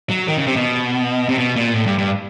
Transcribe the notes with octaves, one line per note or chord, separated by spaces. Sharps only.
F#3
D#3
C#3
C3
B2
C3
B2
A#2
A2
G2
G2